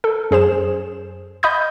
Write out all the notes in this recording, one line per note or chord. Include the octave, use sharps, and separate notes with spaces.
A4
F#2 G#4 C5 E7
D#5 B5 D#6 G6